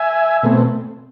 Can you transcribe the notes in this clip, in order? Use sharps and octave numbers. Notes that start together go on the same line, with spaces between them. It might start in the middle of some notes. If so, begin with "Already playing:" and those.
Already playing: E5 G#5
B2 A3 C4